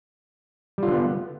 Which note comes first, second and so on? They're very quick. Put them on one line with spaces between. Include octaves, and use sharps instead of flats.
G3 F4 D3 B3